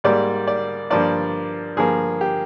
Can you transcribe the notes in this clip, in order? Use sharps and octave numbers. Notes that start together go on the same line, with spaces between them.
G#2 G3 A#3 D5
D5
G2 F3 A#3 D5
G2 F3 A#3 G#4
G4